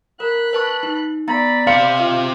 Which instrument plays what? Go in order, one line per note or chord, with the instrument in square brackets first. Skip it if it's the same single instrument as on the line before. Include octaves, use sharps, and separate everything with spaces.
[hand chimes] A#4 [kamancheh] B5 F#6
[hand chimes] B4 A5 C#6
D#4
[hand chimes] B3 A#5 A6 [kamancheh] D5 B5
[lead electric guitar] C4 E5 [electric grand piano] F5 C#7 [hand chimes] C6
[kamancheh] F4 [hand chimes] D#5